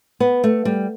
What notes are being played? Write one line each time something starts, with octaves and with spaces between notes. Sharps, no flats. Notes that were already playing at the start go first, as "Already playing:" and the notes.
B3
A3
G3